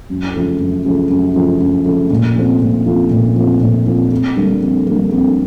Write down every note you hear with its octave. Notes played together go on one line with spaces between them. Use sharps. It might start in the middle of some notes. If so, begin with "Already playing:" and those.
F#2
C#3 F3 A3
F#2
C#3 F3 A3
F#2
C#3 F3 A3
F#2
C#3 F3 A3
A#2
F3 A3 C4 F4
A#2
F3 A3 C4 F4
A#2
F3 A3 C4 F4
A#2
F3 A3 C4 F4
F2
D3 G3 A#3
F2
D3 G3 A#3
F2